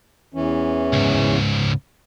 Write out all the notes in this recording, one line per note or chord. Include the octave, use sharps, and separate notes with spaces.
E2 E3 C#4
C#2 G#2